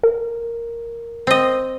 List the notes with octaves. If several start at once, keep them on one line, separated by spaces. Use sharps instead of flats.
A#4
C4 D#5